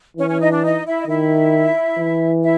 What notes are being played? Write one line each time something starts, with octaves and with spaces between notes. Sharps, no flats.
E3 C#4 C#5
C#4 C#5
D#4 D#5
D4 D5
D#4 D#5
E4 E5
D#5
D#3 E4 E5
E3
E4 E5